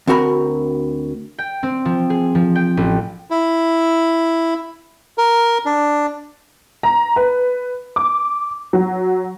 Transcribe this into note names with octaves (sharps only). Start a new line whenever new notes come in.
D2 C4 F#4 A#4 B5
G5
C4
F3
G#4
F3
G5
A1
E4
A#4
D4
A#5
B4
D6
F#3